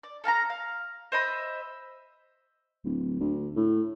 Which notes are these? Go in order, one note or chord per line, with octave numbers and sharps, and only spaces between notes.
D5
A4 F5 A5 A#5
F5
C5 D#5 E5 B5
D1
D2
A2